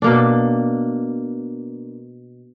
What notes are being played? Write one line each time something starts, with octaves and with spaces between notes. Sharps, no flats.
B2 A#3 D4